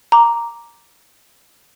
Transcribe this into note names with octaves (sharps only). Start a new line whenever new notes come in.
A#5 D6